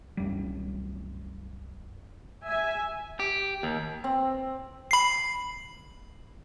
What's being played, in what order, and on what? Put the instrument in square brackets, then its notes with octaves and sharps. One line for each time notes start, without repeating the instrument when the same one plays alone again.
[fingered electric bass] C2 F#2 G3
[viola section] E5 G#5
[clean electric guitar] G4
D#2
[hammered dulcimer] C4
[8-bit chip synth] B5 C7